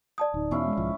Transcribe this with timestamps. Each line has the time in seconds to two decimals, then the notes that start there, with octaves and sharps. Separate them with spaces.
0.18 D5 A5 D#6
0.34 D1 D#4
0.51 E2 B2 C#4 E4 F5
0.65 G#3
0.77 B1 G#2 F3